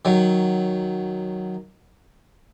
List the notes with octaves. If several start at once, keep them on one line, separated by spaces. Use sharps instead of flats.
D#3 F#3